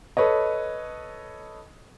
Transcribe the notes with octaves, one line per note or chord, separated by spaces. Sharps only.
A4 B4 C#5 D#5